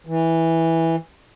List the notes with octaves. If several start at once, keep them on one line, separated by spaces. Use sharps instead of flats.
E3